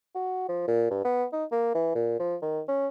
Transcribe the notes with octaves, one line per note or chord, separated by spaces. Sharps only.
F#4
F3
A#2
G2
B3
D#4
A#3
E3
A#2
F3
D#3
C#4